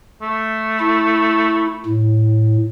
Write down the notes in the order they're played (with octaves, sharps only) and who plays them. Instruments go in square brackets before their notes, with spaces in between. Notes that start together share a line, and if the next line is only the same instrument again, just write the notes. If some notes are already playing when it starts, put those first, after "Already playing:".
[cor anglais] A3
[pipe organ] E4
A2